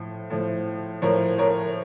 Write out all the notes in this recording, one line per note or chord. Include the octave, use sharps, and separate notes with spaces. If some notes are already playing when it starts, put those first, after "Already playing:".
Already playing: A2 F3
A2 F3
A2 F3 A#4 C#5
A#4 C#5